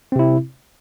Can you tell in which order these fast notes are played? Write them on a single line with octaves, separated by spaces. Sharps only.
C4 C3 E4